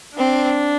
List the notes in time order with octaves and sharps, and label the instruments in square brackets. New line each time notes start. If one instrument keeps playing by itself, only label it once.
[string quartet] C4 [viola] D4